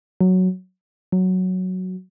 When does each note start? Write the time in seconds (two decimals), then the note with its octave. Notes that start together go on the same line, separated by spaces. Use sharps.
0.21 F#3
1.12 F#3